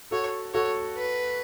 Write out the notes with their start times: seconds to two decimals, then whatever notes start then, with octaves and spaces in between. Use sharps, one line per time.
0.11 F#4 A4 C#5
0.54 F#4 A4 C#5
0.97 B4